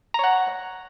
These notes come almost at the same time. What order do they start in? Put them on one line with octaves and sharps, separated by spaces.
A#5 C#5 F#5